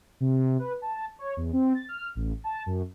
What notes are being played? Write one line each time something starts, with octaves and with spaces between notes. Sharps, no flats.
C3
B4
A5
C#5
E2
C4
A6
F6
A1
A5
F#2